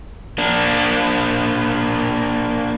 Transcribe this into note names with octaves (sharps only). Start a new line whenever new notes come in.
A#3 D4